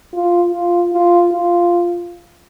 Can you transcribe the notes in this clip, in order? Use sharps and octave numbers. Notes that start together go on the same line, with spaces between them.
F4
F4
F4
F4